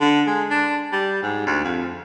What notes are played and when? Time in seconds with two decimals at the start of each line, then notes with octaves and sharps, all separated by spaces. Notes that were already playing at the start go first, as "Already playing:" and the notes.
0.01 D3
0.27 G#3
0.51 D4
0.93 G3
1.23 G#2
1.46 D2
1.64 F2